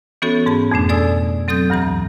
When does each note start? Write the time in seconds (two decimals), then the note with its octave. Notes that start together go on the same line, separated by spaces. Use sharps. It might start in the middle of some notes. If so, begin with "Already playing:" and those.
0.22 E3 B3 C#4 F#4 A4 C#5
0.46 G#2 G#4 A5 B5
0.71 F2 B2 A3 D4
0.89 A4 D5 G#5 D#6 E6
1.48 F#3 C4 A4 D#6 G6
1.70 D2 G2 E3 A#5